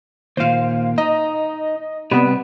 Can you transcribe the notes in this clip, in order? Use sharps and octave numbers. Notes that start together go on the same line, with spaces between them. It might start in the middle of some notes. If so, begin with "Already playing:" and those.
D#2 A#2 C5 F5
D#4 D#5
C3 G3 B3 B4